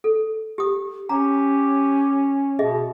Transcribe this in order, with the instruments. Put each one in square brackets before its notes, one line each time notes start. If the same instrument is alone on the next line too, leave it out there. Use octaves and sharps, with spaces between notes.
[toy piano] A4
G4 D#6
[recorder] C#4 [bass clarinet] G4 [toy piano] A#5
[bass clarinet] B2 [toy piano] G#4 D#5 E5